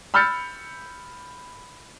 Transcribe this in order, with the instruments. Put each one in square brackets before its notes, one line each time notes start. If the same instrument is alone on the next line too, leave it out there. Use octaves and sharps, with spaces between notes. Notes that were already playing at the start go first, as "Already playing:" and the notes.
[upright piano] B5 E6 F6 G6 A6 C#7